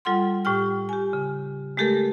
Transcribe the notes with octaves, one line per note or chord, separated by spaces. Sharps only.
G3 F4 A4 F#5 C6
A2 G4 G5 F6
G4 G#5
C#3
G#3 A3 G4 A4 A#4